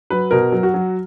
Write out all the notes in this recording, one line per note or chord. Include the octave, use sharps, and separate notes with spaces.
F#3 B4
B2 A#4
F#3
F#4
F#3